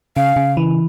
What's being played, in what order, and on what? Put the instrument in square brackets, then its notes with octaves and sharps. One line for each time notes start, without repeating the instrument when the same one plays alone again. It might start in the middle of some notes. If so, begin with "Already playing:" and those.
[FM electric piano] C#3 [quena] F5
[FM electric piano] C#3
E3